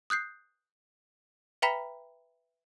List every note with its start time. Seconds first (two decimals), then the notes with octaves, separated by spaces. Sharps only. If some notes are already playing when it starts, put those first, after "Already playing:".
0.10 D#6 F#6 G6 C7
1.62 B4 E5 G5 A#5 B5 B6